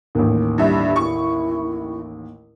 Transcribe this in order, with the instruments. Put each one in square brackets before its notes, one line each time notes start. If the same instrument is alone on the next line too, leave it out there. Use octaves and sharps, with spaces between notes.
[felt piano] A1 D#2
[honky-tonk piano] G2 E5 [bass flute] E4
[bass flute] E4 [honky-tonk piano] C#6